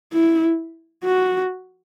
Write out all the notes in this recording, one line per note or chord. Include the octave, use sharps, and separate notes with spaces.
E4
F#4